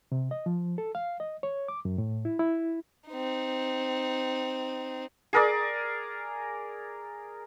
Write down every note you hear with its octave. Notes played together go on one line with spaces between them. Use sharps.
C3
D#5
F3
A4
F5
D#5
C#5
D6
F#2
A2
E4
E4
C4 D#4
G#4 A#4 D5